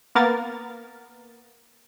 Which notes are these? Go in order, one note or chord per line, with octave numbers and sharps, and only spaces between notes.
A#3 B3 A#4 A6